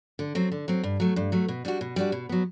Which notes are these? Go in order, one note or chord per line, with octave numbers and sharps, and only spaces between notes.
D3
F#3 C4
D3
F#3 C4
G2
F#3 A3
G2
F#3 A3
B2
G3 D4 F#4
B2
G3 D4 F#4
B2
F#3 B3